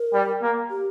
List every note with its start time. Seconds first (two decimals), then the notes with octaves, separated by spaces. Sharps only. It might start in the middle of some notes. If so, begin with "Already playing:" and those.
Already playing: A#4
0.13 G3
0.42 A#3
0.70 G4